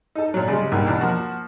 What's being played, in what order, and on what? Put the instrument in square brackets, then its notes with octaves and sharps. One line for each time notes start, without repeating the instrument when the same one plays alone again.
[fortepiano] D#4 A4
A#2 F#3
C#3 G3 G#3
B1 G2 B2 A#3
E2 B2 D4
F3 A#3 F#4